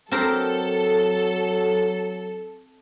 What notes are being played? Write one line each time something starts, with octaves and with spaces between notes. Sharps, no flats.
F#3 C4 G4 A4 A#4